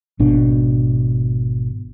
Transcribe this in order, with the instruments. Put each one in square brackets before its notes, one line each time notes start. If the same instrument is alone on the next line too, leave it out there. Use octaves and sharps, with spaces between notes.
[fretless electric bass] G#1 B2 D4